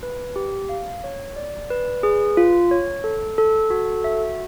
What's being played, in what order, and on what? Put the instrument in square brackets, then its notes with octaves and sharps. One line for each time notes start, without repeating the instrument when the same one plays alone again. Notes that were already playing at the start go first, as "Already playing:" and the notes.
[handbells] B4
G4
F5
C#5
D5
B4
G#4
F4
C#5
A4
A4
F#4
E5